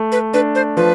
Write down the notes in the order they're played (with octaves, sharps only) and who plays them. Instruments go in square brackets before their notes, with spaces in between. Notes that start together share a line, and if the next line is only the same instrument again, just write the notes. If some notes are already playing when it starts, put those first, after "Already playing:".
Already playing: [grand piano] A3
[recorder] B4
[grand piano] D4 [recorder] B4
[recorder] C5
[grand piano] F3 [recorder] B4